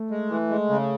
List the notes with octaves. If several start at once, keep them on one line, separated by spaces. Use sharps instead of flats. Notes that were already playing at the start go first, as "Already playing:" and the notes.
Already playing: A3
G#3
E3
G#3
C#3